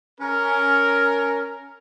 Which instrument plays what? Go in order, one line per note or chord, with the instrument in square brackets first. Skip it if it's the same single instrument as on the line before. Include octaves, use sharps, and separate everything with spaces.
[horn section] C#4 A#4